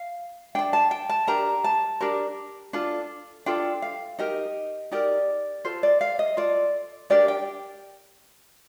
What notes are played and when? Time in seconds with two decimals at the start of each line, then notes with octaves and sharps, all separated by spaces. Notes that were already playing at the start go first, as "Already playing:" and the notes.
Already playing: F5
0.55 D4 A4 G5
0.73 A5
0.91 G5
1.09 A5
1.27 D4 G4 A#4 A#5
1.64 A5
2.01 D4 G4 A#4
2.73 D4 F4 A4
3.46 D4 F4 A4 G5
3.82 F5
4.19 D#4 G4 A#4 D#5
4.91 D#4 G4 A#4 D5
5.65 F4 A4 C5
5.83 D5
6.01 F5
6.19 D#5
6.37 F4 A4 D5
7.10 D4 G4 A#4 D5
7.28 G5